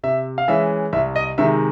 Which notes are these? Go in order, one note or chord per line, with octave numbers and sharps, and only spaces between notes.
C3 E5
F5
E3 G#3 C#4 E5
C2 E5
D#5
C3 D#3 G#3 E5